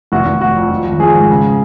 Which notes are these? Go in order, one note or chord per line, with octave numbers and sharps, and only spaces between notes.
F1 F#4
F1
F1 F#4
F2
F3
G#1
F3 G#4
G#2
C#3